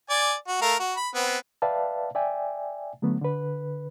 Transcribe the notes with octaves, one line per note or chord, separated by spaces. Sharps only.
D5 G#5
F#4
A3 A#4 F5
F#4
B5
B3 C4
B4 D5 E5 F5 G5 A5
D5 E5 G5 G#5
D3 F#3 A3 B3
D3 B4